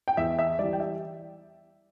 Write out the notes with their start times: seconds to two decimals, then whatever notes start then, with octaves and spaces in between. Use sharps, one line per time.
0.08 G5
0.17 E2 E5
0.39 E5
0.59 E3 G3 D5
0.73 G5
0.80 E5